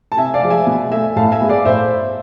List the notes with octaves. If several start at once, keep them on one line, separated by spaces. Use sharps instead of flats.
A5
C3 E5 G#5
D5 F5
F3 G#3
E5 G#5
B2
A3 E5 G#5
A2 F5 A5
E5 G#5
G#3 B3
D5 F5
A2 C5 E5